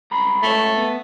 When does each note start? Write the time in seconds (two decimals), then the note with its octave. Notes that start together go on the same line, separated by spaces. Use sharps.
0.11 C#2 A#5 B5
0.43 C#2 A3 C#5
0.77 B3